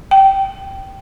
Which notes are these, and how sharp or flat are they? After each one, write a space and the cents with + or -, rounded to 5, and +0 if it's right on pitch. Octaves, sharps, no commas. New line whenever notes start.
G5 -15